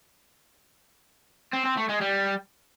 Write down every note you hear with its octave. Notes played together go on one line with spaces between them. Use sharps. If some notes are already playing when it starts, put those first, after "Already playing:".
C4
C4
A3
G#3
G3